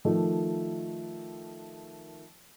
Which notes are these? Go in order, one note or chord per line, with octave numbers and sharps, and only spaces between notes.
D#3 F3 A3 F4